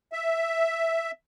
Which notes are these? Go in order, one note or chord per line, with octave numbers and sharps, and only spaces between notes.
E5